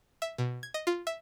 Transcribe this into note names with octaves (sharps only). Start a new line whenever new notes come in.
E5
B2
G#6
D#5
F4
E5